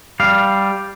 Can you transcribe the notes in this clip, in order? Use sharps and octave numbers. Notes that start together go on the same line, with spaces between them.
G3 F5